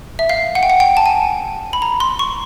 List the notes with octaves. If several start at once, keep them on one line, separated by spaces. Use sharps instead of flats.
E5
F5
F#5
G5
F#5
G5
A5
G#5
B5
A#5
C6
C#6